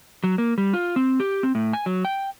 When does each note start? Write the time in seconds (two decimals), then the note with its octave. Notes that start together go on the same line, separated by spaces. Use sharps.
0.24 F#3
0.38 A#3
0.58 G3
0.73 F4
0.96 C4
1.20 G4
1.43 C4
1.55 A2
1.73 G#5
1.86 F#3
2.05 G5